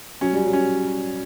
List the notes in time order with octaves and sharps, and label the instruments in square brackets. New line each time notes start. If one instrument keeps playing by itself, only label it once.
[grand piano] F#3 [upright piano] C#4
[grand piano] G3 [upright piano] C#4
[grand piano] F#3
[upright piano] C#4